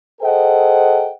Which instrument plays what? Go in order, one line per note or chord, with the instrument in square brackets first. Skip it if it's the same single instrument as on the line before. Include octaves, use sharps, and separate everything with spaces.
[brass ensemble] G#4 A4 C5 D#5 F#5 G5